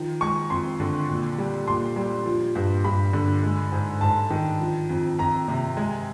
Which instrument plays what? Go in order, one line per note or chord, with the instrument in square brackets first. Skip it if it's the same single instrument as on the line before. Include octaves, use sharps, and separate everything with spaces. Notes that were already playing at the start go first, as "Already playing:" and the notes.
Already playing: [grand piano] D#3 F3
G#3 C#6
F2 C6
D3
A#2
G3
A#2 C6
G3
F3
G2
G2 B5
D3
G#3
G#2
G#2 A5
D#3
F3
F2
F2 A#5
C3
G#3